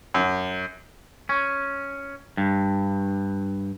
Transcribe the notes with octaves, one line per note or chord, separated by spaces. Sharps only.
F#2
C#4
G2